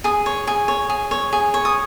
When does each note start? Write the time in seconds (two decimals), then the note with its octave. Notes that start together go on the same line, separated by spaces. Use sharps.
0.04 G#4 D#6
0.26 C#5
0.47 G#4
0.68 C#5
0.89 G#4
1.11 C#5
1.33 G#4
1.54 C#5
1.65 D#6